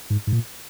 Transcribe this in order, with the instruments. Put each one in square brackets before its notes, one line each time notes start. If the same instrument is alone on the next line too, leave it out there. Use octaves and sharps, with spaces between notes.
[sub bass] G#2
G#2
A#2